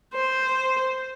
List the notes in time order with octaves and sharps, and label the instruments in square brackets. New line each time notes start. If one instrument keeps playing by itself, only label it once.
[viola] C5